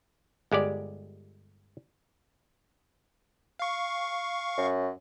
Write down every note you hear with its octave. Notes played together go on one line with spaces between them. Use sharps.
G1 G#3 G4 D5
F5 C#6
F#2